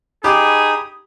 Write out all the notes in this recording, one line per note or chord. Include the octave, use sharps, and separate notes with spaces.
D#4 G4 G#4 B5 D#6